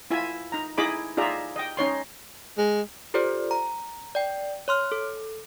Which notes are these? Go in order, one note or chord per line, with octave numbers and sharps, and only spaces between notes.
E4 F4 E5 G#5
D#4 A#5
D#4 E4 G#4 D#5 B5 D6
D#4 F4 G#4 D5 E5 A#5
D#5 G5
C#4 D#4 C#5 C6
G#3
F4 G4 A4 C5 D5
A#5
D5 G5
C#5 C6 F6
A4